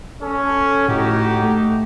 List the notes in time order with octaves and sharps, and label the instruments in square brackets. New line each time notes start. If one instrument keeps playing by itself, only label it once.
[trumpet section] C#4 [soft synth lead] A4
[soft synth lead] A2 [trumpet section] D#4 F#4 G4
[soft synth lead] A3